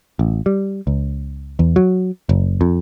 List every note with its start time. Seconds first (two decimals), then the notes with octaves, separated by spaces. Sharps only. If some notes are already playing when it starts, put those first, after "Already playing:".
0.19 A1
0.46 G3
0.87 C#2
1.59 E2
1.76 F#3
2.29 F#1
2.61 F2